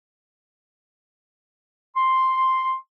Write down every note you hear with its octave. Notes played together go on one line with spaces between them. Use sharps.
C6